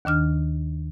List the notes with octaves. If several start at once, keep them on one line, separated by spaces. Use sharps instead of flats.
D#2 D#3 D4 F6